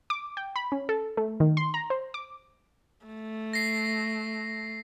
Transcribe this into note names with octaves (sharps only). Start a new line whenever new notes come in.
D6
G5
B5
C#4
A4
A3
D#3
C6
A#5
C5
D6
A3
A#6 C7